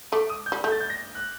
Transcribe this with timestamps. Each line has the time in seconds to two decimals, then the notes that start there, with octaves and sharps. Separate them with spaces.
0.12 A3 D6
0.30 D#6
0.46 G6
0.52 G3
0.64 A3 G6
0.72 A6
0.81 G6
0.90 A#6
1.15 F#6